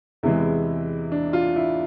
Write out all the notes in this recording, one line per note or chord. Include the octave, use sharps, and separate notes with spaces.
E2 C3 E3 G#3 E4
D4
F4
E4